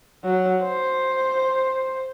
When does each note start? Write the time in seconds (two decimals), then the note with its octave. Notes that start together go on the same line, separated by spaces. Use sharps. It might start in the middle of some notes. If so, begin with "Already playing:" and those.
0.24 F#3
0.62 C5